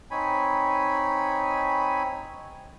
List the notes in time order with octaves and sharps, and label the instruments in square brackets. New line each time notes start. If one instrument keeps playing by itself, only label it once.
[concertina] C4 D#4 C#5 G#5 B5